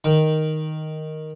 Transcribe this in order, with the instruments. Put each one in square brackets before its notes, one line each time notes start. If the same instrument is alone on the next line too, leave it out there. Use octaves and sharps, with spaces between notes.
[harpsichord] D#3